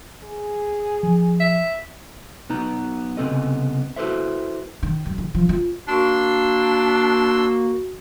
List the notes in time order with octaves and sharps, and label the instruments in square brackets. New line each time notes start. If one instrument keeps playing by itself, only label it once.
[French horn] G#4
[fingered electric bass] F3
[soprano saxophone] E5
[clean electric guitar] B1 B3 D#4 A#5
C2 C#3 B3 C4 A4 D#5
E4 F#4 A4 B4 C5 E5
[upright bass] D#3
F#2
D#3
F3
F4
[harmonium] A#3 [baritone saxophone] D4 [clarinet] F#4 [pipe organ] C6 E6